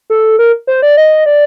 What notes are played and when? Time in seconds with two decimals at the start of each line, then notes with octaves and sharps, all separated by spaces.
0.10 A4
0.39 A#4
0.67 C5
0.82 D5
0.97 D#5
1.26 D5